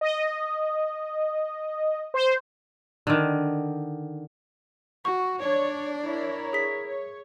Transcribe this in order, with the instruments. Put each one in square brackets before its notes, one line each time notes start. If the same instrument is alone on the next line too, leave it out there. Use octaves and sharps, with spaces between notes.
[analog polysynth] D#5
C5
[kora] D3 D#3
[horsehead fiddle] F#4 [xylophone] C#6
[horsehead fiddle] D4 D5 [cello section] C#5
[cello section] E4 A#4 C#5
[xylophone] G#4 B6
[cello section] C#5